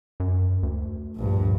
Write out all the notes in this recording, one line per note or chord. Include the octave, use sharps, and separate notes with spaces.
F#2
D2
A#1 G2